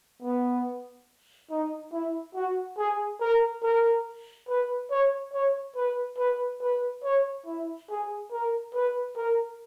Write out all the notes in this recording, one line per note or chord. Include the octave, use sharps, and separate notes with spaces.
B3
D#4
E4
F#4
G#4
A#4
A#4
B4
C#5
C#5
B4
B4
B4
C#5
E4
G#4
A#4
B4
A#4